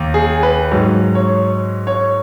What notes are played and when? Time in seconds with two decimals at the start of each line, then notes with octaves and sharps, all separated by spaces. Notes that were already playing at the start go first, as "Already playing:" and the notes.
Already playing: D#2
0.14 G#4
0.43 B4
0.71 G#2 F#3
1.15 C#5
1.87 C#5